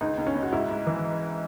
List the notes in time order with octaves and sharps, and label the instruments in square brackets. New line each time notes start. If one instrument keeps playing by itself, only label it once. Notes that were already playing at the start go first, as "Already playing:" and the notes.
[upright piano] C#2 D#4
C#2
C#4
C#2
F#4
G#2 E4
G#2
E3